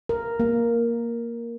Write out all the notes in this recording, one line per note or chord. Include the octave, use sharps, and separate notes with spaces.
A#4
A#3